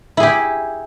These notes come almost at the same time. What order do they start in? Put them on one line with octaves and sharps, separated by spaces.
E4 G#4 G4